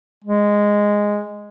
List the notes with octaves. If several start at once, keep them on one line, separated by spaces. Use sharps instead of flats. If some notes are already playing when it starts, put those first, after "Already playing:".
G#3